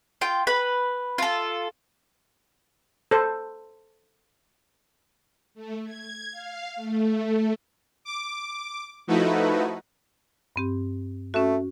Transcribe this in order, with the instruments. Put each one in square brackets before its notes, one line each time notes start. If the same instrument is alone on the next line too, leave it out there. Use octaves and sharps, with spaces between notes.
[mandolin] F4 G5
B4 B5
F4 A4
[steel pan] A4 C5
[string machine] A3
G#6
F5
A3
[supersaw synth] D6
F3 A3 D#4 E4 F#4 B4
[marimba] G2 C4 G4
[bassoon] A3 [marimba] C#4 F#4